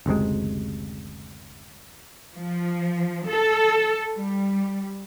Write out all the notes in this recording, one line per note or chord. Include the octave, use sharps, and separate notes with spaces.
F#1 D2 C3 G#3
F3
A4
G3